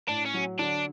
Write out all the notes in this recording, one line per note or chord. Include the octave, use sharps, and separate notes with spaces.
A2 D4
C#4
F#3
D3 D4